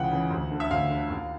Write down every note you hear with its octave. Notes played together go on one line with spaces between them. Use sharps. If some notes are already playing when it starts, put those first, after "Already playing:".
Already playing: C#2 C#3 E3 F#5 G5
C#3 E3
D2
D3
E5
D2 F5
D3
D#2